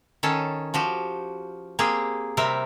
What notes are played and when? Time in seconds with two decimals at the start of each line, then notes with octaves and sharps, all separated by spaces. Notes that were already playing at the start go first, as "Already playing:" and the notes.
0.23 D#3 C#4 A4
0.74 F3 F#4 G4
1.79 A#3 C4 G4 G#4
2.37 C3 G3 C4 A#4 E5